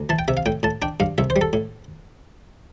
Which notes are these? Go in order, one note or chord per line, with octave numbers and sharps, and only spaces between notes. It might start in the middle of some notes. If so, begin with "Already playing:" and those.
Already playing: D2
E3 A5
G5
C3 E5
F5
A2 G5
A2 A5
D4 G5
G2 F5
C2 E5
C5
G3
A4
A2